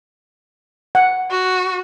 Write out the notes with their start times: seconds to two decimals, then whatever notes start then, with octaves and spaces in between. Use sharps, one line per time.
0.95 F#5
1.31 F#4